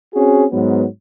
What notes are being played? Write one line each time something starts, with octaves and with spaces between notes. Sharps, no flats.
C4 C#4 F#4 G#4
G#2 F#3 B3